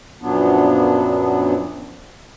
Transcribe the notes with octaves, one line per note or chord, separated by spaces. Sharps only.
F#2 A#2 F3 F#3 B3 D4